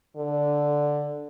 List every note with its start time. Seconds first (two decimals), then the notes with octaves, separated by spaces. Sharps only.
0.16 D3